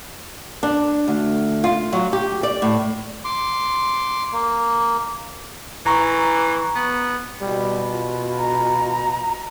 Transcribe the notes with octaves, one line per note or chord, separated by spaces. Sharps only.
D4
D2
F4
F#3
G4
D5
A2
C6 D6
A#3
A1 E3 A#5 C#6
B3
B2 G3
F4
A#5